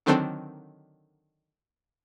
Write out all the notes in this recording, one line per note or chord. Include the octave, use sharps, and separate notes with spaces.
D3 D#3 F#3 C4 D4 A4